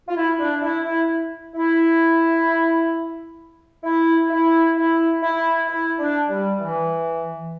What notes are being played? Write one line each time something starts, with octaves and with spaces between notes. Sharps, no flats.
F4
E4
D4
E4
E4
E4
E4
E4
E4
E4
E4
D4
G3
E3